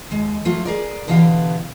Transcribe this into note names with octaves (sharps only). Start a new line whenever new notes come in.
D#2 G#3
F3 F#3 A3 F4
G#4 A#4 D5
B2 D3 E3 B3 G4 F5